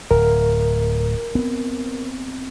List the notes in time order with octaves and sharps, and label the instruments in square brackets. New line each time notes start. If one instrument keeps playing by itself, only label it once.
[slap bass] D1 [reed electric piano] A#4
[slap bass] B3 C4